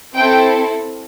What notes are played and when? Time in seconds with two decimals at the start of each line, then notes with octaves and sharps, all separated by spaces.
0.15 C4 E4 A4 G5